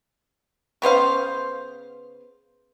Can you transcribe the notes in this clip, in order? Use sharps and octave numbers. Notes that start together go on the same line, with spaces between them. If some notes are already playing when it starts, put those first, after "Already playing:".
C#3 B3 C5 F5